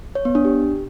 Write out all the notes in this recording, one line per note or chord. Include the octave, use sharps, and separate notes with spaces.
C#5
B3
D4
G4